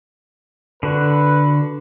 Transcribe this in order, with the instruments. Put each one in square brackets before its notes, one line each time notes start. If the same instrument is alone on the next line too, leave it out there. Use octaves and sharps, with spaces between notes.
[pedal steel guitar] D3 F#4 [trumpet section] B4